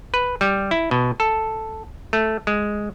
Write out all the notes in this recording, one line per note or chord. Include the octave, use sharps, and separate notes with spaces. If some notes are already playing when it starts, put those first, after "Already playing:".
B4
G3
E4
B2
A4
A3
G#3